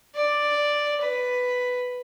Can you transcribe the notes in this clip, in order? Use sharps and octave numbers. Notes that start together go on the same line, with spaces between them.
D5
B4